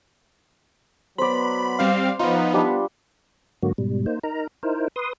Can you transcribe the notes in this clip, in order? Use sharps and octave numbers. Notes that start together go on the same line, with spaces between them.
F#3 B3 C5 D5 B5
G3 C4 F5
F3 B3 D#4 F4
G3 D4
G#2 D3 F#3 A#3 F#4
G#2 B2 G3
A#3 D#4 C5
D#4 A#4 A#5
D#4 E4 A#4 C5
B4 C6 D#6